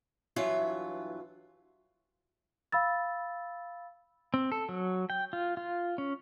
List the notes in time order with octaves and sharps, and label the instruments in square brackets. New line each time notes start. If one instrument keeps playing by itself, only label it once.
[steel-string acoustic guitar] G2 E3 F#3 F4 E5
[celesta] F5 B5 E6 A6
[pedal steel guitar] C4
A4
F#3
G5
F4
F4
C#4